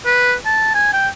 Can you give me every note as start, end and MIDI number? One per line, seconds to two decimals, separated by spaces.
0.06 0.34 71
0.46 0.74 81
0.75 0.93 80
0.93 1.08 79